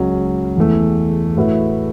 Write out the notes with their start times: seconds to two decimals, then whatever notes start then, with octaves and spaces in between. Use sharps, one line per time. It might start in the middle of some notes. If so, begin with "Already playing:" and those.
Already playing: C#2 C#3 F#3 C#4
0.56 E2 E3 A3
1.37 A2 A3 F#4 B4 E5